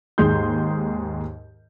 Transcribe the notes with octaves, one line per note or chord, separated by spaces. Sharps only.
D#2 G#2 G#4 C6 G6